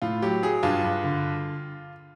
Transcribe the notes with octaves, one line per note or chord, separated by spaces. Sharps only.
A2 F4
F#3 G4
F#3 G#4
G2 F4
G2
D3